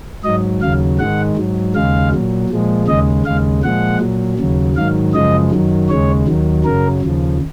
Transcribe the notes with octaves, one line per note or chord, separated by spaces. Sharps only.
G#2 F#3 D#5
D#2 C#3 F#3 F5
G#2 D#3 G#3 F#5
G#2 F#3
D#2 C#3 G#3 F5
A#2 F#3
A#2 F3 G#3
D#2 C#3 G#3 D#5
D#2 C#3 G#3 F5
A#2 F3 G#3 F#5
A#2 F#3
D#2 C#3 F#3
G#2 D#3 F#3 F5
F#2 C#3 F3 G#3 D#5
F#2 D#3 F#3
D#2 C#3 G#3 C#5
D#2 D#3 F#3
F#2 C#3 F#3 A#4
D#2 C#3 F3